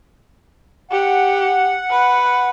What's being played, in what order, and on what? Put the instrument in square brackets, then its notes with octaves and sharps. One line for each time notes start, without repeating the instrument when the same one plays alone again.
[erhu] G4 [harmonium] F#5
[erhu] B4